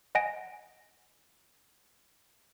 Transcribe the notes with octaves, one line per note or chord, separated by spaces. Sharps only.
D#5 F#5 G#5 A#6 D7